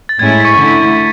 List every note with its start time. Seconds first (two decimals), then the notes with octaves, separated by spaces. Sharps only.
0.09 A6
0.19 A2 G#3 C#4 E4 G#6
0.32 A6
0.40 B6
0.44 C#6 C#7
0.56 D3 A3 E4
0.95 B6